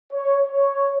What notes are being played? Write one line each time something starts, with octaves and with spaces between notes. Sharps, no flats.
C#5
C#5